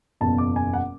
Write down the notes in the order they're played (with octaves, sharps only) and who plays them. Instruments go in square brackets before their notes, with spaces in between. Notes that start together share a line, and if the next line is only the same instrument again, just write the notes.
[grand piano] F#1 E2 B2 A5
D6
G#5
F#5